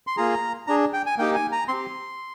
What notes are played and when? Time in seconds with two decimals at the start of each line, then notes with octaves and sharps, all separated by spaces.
0.07 C6
0.17 A#3 F4 G#4 A#5
0.67 D4 G#4 A#5
0.93 G5
1.06 G#5
1.18 A#3 D#4 G4 G5
1.35 G#5
1.52 A#5
1.68 C4 G4 C6